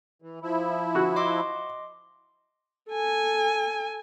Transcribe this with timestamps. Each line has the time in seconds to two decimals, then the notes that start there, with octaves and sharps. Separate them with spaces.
0.22 E3
0.42 F3 E4
0.95 F#4 F#6
1.16 D#5 C6 D6
2.90 A4 G#5